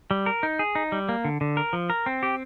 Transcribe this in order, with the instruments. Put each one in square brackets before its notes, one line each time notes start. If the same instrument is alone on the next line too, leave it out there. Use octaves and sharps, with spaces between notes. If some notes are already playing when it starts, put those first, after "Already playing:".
[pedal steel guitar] G3
A#4
D#4
G#4
D#4
G3
A#3
D3
D3
A#4
F3
A#4
C4
G4